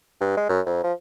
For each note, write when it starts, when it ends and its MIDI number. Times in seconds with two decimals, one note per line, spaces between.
0.20 0.33 43
0.37 0.45 56
0.49 0.61 42
0.66 0.83 41
0.83 0.93 53